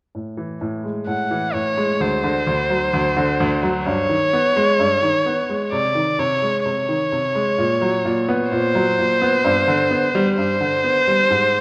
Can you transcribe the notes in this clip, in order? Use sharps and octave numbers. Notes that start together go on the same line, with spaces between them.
A2
E3
A2
G#3
A2 F#5
E3
A2 C#5
G#3
D2 C5
D3
D2
F#3
D2
D3
D2
F#3
G2 C#5
D#3
B3
G#3
G2
D#3
B3
G#3
C3 D5
D#3
C3 C#5
G#3
C3 C#5
D#3
C3
G#3
A#2
F#3
A#2
B3
A#2 C5
F#3
A#2
B3
G2
D3
B3
G3
G2 C5
D3
B3
G3
G#2